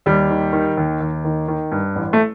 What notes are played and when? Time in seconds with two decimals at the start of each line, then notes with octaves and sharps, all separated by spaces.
0.06 D#2 G3
0.30 D#3
0.53 D#3
0.77 D#2
1.00 D#2
1.25 D#3
1.48 D#3
1.72 G2
1.96 A1
2.13 A3